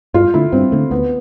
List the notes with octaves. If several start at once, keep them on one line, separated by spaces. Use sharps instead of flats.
G2 F4
D3 A3 E4
G2 C4
D3 A3
D2 B3